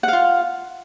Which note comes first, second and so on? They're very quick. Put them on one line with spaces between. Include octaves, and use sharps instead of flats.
F#5 F5 F4